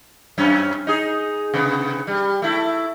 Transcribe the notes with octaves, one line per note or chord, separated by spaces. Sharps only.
F#2 C#4
D#4 G#4
C3 B3
G3
A3 E4